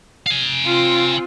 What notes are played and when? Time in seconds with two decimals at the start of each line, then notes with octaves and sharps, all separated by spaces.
0.26 F5 G#5
0.65 C4 F4